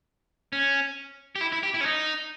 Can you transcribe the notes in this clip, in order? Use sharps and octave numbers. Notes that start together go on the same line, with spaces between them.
C#4
G4
E4
E4
G4
E4
C#4
D#4